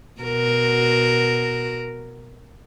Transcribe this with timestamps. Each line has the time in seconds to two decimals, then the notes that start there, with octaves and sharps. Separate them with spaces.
0.21 B2 F#4 A#4